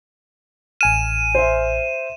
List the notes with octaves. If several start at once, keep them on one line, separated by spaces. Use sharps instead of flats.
A1 G#5 F6 D#7 E7
C5 E5